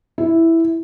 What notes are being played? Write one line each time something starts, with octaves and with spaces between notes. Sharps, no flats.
E4